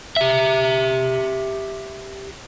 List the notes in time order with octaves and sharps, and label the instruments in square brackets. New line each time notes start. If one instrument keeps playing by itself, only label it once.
[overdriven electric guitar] G4 E5